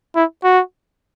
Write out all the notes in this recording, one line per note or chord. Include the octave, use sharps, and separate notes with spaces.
E4
F#4